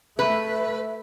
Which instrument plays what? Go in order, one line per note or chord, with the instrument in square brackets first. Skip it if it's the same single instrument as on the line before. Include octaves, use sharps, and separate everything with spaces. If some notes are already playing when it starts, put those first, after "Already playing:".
[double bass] A3 [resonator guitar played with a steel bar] B4 [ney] E5